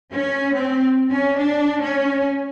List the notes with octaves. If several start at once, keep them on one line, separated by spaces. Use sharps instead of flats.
C#4
C4
C#4
D4
C#4